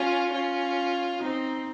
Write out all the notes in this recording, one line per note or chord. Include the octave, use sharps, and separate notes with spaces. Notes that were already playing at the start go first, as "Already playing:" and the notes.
Already playing: C#4 F4
C#4 F4
C4 D#4